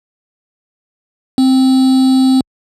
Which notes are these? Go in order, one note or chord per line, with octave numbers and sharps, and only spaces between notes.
C4